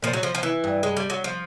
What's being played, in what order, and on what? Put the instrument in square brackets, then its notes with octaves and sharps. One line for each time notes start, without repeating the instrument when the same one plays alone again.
[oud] A#2 [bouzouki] F3
[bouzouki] F#3
F3
F3
E3
[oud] G2
[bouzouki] G#3
G3
F#3
F3